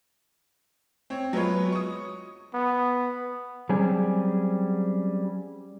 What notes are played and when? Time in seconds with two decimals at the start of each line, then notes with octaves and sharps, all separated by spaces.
1.10 C4 C#5
1.33 F#3 G#3 B3 F4 B4 C#5
1.72 C#6 D#6
2.54 B3
3.69 F#3 G3 C4 C#4 G#4